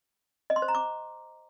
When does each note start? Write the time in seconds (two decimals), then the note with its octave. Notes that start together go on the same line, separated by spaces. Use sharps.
0.50 D#5
0.56 C6
0.62 C5
0.68 A#5
0.75 D6